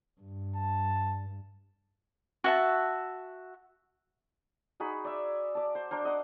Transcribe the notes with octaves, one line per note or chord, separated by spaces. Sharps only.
G2
A5
F#4 E5 A5
D#4 F#4 G#4 B5
D5 E5
D5 A5
C5
D4 A#4 C5
D#5 F#5 D6